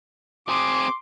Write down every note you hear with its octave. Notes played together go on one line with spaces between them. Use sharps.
C4 G#4 C6 D6